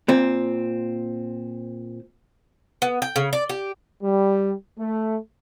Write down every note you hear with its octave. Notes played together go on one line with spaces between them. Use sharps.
A#2 C4
B3
G5
C#3
D5
G4
G3
A3